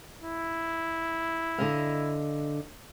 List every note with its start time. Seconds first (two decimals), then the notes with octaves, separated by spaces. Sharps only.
0.23 E4
1.58 D3 D#5 F5